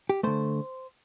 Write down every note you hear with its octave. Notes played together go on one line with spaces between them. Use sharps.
G4
D3 A3 C5